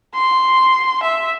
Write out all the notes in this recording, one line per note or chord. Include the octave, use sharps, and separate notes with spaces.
C6
E5